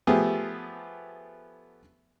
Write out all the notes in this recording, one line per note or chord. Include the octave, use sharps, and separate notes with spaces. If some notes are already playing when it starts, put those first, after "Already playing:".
F3 A3 B3 G4 G#4